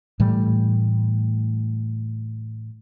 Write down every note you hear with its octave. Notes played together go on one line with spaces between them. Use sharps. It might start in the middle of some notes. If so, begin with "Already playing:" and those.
A2 E3 G3 A3